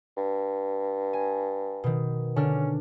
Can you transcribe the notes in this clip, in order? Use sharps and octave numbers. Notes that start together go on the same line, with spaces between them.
G2
G#5
B2 D#3
D3 C#4 D4 F6